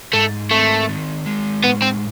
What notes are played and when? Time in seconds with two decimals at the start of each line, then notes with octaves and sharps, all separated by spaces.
0.13 G#2 A3
0.51 A3 C4
0.89 D#3
1.26 G#3
1.63 A2 B3
1.82 C4